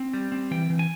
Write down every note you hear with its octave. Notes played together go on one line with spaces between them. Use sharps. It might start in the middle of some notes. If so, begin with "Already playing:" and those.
Already playing: C4
G3
C4
E3 G5
E3
G#5